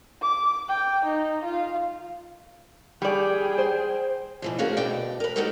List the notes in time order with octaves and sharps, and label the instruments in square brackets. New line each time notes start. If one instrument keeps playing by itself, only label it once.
[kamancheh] D6
G5
D#4
F4 F5
[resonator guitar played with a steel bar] G3 D5 [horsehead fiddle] G#4 G5
[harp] C5
[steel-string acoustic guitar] B2 E3 F3
A3 C#4 F#4 G#4 A#4 F5
D2 B2 D5 G5
A#4 B4
B3 D#4 F#4 G4 A4 A#4